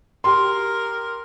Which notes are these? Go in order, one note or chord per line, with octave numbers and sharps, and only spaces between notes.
G4 A#4 C6